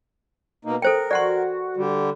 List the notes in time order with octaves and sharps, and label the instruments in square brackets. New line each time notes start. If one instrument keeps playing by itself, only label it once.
[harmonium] B2 A#3 D#4
[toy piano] A4 C5 G5 [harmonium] A#4
[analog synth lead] F#4 [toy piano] D5 F#5 C6
[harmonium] D3 G3